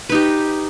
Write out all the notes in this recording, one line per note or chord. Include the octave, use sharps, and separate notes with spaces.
D#4 G4 B4